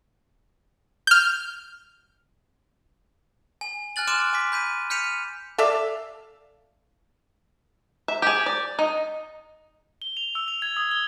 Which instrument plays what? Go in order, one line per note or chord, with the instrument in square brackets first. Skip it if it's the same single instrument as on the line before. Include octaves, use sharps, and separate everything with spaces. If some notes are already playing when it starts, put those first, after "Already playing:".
[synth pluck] F6 G6
[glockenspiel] G#5
G#5 F6 F#6 A6 F#7
C6 D6 F6 F#6 D7 E7
G#5 D6 B6
B5 G6 B6 D#7
F6 G6 B6 C#7 D#7 F7
[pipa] A4 D5 E5 F5
[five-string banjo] E5
G4 G#4
D5
D#4
[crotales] G7
F7
E6
F7
G#6
D#6
G7